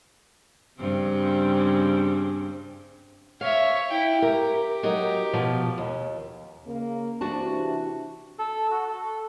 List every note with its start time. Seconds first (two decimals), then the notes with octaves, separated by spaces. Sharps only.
0.79 G2 C#3 C4
3.41 C#5 E5 F5
3.90 E4 G5
4.22 G4 A#4
4.83 F#3 D#4 A#4
5.33 B2 F3 F#3
5.78 D#2
6.65 C#3 A#3
7.21 C3 E3 D4 F#4 A5
8.39 A4
8.71 F#4
8.88 A4